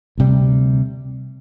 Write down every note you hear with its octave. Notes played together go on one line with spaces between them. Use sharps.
D2 C3 G3